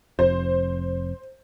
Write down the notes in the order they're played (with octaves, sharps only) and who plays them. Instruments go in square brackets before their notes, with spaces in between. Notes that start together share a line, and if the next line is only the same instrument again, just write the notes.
[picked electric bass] F1 F2 [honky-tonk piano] C5